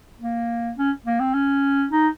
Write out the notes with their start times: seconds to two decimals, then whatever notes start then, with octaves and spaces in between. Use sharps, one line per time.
0.20 A#3
0.78 C#4
1.06 A#3
1.20 C4
1.34 C#4
1.91 D#4